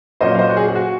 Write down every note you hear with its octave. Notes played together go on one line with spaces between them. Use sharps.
A#2 F#3 C#4 F4 C5 D#5
F5
C5 D#5
F#4
G#4
G#4
F#4